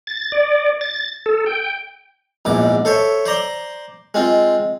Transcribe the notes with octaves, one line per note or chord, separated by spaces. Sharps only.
A6
D5
A6
A4
G5
A#1 E2 G#2 D6
A4 C5 C#5 E5
C5 D5 A#5 C6
G#3 C4 F4